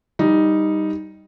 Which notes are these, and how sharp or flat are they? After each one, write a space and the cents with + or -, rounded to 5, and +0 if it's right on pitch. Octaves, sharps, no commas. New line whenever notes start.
G3 +0 D#4 +0